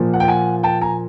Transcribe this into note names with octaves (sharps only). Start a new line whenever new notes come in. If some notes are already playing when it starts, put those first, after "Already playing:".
Already playing: A#2 F3
F#5
G5
F#5 G#5
G5 A5
G#5 A#5